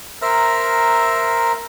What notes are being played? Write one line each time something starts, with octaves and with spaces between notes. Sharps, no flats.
A#4 C5 E5 A#5 F6